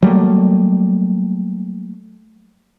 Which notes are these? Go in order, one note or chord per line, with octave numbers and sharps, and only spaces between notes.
F#3 G3 A3 A#3